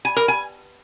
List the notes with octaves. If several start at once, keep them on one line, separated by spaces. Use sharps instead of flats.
G#5
A#4
G#5